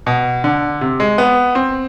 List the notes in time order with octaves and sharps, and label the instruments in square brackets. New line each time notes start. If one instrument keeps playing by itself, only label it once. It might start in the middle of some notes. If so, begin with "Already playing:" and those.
[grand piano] B2
D3
C3
G#3
B3
C4